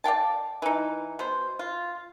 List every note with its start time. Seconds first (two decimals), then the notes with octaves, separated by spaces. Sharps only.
0.04 D5 F5 G5 A5
0.62 E3 D#4
1.19 B2 C5
1.59 F4